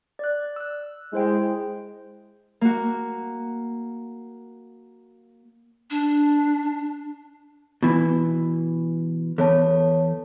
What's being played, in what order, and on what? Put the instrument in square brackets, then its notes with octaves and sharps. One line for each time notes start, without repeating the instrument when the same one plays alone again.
[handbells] D5 F#6
E6 F#6
[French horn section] G#3 [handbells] E4 C5 G5
[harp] A#3 F#4
[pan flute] D4
[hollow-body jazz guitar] B2 E3
[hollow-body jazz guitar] E2 [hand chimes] A4 C#5 A5